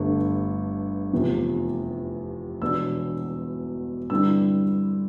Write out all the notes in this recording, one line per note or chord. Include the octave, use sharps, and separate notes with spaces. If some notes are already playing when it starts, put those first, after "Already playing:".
Already playing: G1 G2 D3 A3
F1 E2 C3 F3 B3
E1 E2 B2 B3 D4 E6
G2 D3 G3 C4 E4 E6